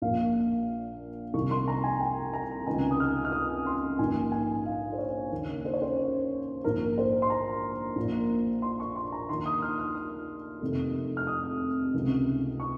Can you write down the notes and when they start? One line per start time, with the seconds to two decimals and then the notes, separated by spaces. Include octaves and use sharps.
0.02 A#1 A#2 F5
1.34 C2 C3 D#3 C#6
1.51 C6
1.68 A#5
1.84 G#5
2.00 G5
2.33 A#5
2.67 C#2 C3 D#3 G#5
2.91 D#6
3.00 F6
3.25 F6
3.32 D#6
3.66 C6
3.99 A#1 G#2 D#3 G#5
4.32 G#5
4.66 F5
4.93 C5
4.98 C#5
5.32 D#2 C#3
5.65 C5
5.73 C#5
5.82 C5
6.64 A#1 G#2 D#3 A#4
6.98 C5
7.22 C6
7.30 A#5
7.96 A#1 A#2
8.62 C6
8.80 C#6
8.96 C6
9.12 A#5
9.29 D#2 D#3 C6
9.46 D#6
9.62 F6
9.79 F6
9.95 D#6
10.61 F1 F2 C3 D#3
11.17 F6
11.27 D#6
11.94 C#2 C3 D#3
12.60 C#6